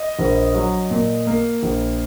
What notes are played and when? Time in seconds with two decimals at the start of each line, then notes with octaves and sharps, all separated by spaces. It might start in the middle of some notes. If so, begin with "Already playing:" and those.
Already playing: D#5
0.19 A#1
0.55 F#3
0.90 A#2
1.27 A#3
1.63 A#1